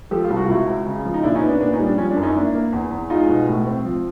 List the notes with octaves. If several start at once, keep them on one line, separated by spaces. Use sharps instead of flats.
F3 G4 A4
F4 G4
C2
F#4
F4
C#2 E4 F#4
C#2
C#3
F3
D#4
A#2 D4 E4
C#4 D#4
B3
D4
A#2 D4
C#4 D#4
G3
D4
F3 C#4
D4
F#2
C#4 D#4
A#3 D4 E4
A#3
E2
E2
G#3 D#4 F4
B2
A2
C4
F3